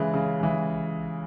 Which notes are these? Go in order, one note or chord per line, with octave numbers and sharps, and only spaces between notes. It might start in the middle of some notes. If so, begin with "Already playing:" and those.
Already playing: C#3 E3 G#3
C#3
E3 G#3